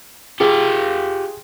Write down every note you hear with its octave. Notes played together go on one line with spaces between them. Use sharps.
F4 G4 G#4